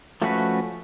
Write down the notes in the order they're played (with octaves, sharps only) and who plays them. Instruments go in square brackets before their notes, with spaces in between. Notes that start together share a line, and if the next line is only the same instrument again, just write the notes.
[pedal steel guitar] F3 A3 C#4 F#4 B4